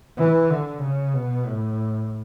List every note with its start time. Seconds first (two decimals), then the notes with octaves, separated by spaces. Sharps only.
0.18 E3
0.50 D3
0.83 C#3
1.14 B2
1.46 A2